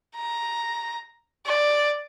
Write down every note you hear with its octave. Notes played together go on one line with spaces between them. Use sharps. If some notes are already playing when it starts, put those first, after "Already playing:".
A#5
D5